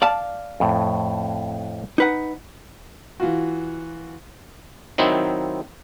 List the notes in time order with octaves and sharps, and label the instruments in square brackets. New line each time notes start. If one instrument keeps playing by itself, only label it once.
[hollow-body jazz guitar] D5 F5 A5
[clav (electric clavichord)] F2 A2
[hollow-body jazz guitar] D#4 B4 F#5
[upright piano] E3 F4 F#4
[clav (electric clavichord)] D#3 F#3 C4 D#4 E4